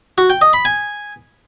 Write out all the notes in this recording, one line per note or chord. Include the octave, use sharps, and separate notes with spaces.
F#4
G5
D#5
B5
G#5